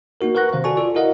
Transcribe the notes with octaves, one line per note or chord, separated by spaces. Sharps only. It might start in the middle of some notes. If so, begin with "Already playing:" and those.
A#3 D#4 F#4 A#4
A#4 B4 F#5 C#6 F#6 A#6
C3 D#3 C5 F5
F#4 A4 D5 G#5 A5 C#6
F4 A4 D5
E4 F#4 A#4 D#5 F5 F#5